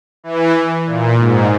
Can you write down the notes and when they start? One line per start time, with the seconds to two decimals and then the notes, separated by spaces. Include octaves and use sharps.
0.24 E3
0.86 A#2
1.18 G#2